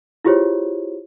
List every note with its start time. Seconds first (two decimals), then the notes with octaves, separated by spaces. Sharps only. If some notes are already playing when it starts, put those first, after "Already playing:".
0.24 E4 F4 G4 G#4 C5 C#5